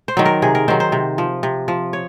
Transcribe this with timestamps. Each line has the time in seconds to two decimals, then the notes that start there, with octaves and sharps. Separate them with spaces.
0.08 C5
0.17 D#3 F#3
0.26 A#4
0.42 C3 G#4
0.55 A#4
0.68 D#3 F#3 C5
0.80 C5
0.92 C3
1.18 F3
1.43 C3
1.68 F3
1.93 C#5